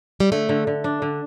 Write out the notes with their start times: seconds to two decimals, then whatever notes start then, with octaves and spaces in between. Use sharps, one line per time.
0.20 G3
0.32 D3 A3
0.49 D3
0.67 D3
0.84 D4
1.02 D3